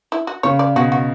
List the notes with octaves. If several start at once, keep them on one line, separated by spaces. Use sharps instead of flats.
E4
F#4
C#3 C#5
D5
B2 F#4
F#4